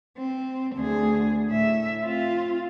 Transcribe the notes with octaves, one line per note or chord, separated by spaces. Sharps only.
C4
D2 G#4
A2 E5
C4 F4